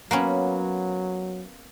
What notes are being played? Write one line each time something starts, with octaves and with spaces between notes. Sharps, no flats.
F#3 A#3 B3 C#4